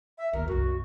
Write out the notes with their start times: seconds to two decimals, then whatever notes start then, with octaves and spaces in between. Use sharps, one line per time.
0.18 E5
0.33 D#2 A#4
0.48 C2 F#2 F#4